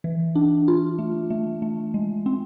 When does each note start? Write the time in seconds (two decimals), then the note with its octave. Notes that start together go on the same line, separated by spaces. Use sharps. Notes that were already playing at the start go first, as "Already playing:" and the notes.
0.04 E3
0.35 D4
0.68 F4
0.99 A3
1.30 A3
1.62 A3
1.94 G#3
2.26 C4